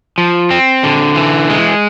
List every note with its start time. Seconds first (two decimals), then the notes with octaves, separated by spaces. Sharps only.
0.18 F3
0.51 C4
0.84 D3
1.16 E3
1.50 G#3